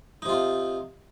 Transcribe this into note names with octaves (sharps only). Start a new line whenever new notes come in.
C3 D#4 F4